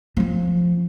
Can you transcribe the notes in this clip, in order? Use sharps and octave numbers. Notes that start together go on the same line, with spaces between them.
F3 C#4